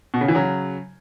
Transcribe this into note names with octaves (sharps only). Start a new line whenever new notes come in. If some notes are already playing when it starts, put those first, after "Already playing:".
B2
C#3
E3
C#3 F#3